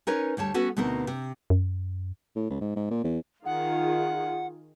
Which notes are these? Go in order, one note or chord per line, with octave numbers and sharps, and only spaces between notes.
C#4 D#4 A#4 B4 C#5
D2 G3 C#5 A5
B3 C#4 F#4 A4 B4
D2 B2 B3 C4 D#4 A#4
C3
F#2
A2
C#2
G#2
G#2
A#2
E2
D#3 F4 G#4 F#5